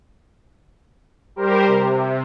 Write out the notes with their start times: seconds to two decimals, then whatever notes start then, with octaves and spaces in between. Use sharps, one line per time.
1.36 G3 G4 A#4 C5
1.67 C3